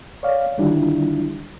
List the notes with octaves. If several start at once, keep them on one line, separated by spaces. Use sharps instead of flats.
C#5 D5 F5
D3 D#3 G3 D4 E4 F4